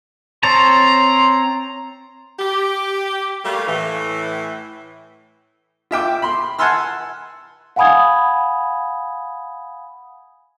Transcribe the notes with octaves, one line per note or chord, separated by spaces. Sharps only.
C4 C#5 A5 A#5 C6
G4
G3 A3 A#3 F5
A2 E3
F4 E5 G5 D6
B5 C6
F#5 G#5 A5 C6 E6 F6
F5 F#5 G#5 B5 D#6 G#6